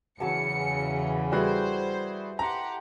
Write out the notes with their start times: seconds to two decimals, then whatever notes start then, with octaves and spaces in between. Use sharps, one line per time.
0.20 E2 C#3 E3 F#3 G#4 A5 C#7
1.32 G3 E4 F#4 G#4 A4 B4 C5
2.39 G4 F#5 A5 A#5 C6